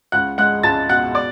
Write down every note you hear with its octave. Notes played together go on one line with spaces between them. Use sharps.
C#2 F#5 F#6
G#3 F#5 F#6
C#2 A5 A6
B2 F#5 F#6
D5 D6